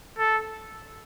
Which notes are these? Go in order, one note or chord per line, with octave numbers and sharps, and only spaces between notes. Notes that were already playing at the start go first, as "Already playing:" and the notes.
A4